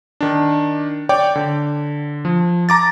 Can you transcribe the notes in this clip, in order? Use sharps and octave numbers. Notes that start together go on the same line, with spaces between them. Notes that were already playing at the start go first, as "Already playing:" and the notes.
D#3 D4
C#5 D5 G5 D6
D3
F3
A#5 D6 A6